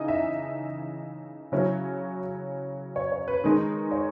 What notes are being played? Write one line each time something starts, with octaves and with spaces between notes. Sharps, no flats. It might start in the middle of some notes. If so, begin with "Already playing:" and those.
Already playing: C#3 E3 D#4 D#5
E5
C#3 F#3 C#4 E4
C#5
C#5
B4
D#3 G#3 D#4
C#5